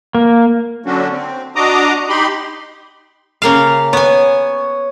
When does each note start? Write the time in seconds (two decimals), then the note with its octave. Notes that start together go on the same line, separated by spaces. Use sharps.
0.15 A#3
0.86 D3 F#3 C#4 D4 F#4
1.11 C4
1.56 D4 F#4 D#5 A#5 D6 D#6
2.09 D#4 G4 B5 C6
3.42 C#3 A#3 F5
3.93 B3 C#5 G#5